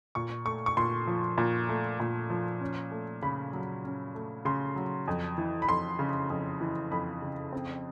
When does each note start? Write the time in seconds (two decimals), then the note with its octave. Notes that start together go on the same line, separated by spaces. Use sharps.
0.15 A#2 C#6
0.45 A3 C#6
0.66 C#6
0.77 A#2 C6
1.07 F3
1.38 A#2
1.69 A3
2.00 A#2
2.30 F3
2.61 C#4
2.91 A3
3.22 C#3 B5
3.53 F#3
3.84 C#4
4.15 A3
4.45 C#3 C6
4.76 F#3
5.08 F2
5.38 E3
5.62 B5
5.68 F2 C6
5.99 C#3
6.30 F2
6.61 E3
6.91 F2 B5
7.22 C#3
7.53 C4